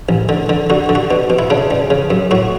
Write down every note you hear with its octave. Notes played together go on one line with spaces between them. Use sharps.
A1
D3
D3
D3 F#4
D3
F#4
B2
B2
E4
C#3 D4
C#2
C#3
F#2
A2 F#4